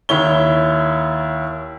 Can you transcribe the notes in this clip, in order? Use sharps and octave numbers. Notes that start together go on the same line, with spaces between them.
D#2 E4 C#5 G7